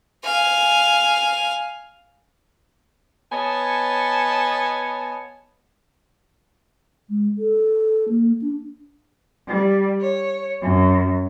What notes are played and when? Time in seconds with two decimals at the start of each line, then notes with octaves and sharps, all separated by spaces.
0.25 F5 G#5
3.32 B3 C#5 D#5 G#5 A5
7.10 G#3
7.38 A4
8.09 A#3
8.42 D4
9.47 G3
10.00 C#5
10.60 F#2